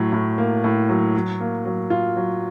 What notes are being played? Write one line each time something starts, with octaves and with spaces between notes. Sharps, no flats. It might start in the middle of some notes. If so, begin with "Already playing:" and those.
Already playing: A2 F#3
A2
A#3
A2
F#3
F#3
A#3
F#3
F4
F#3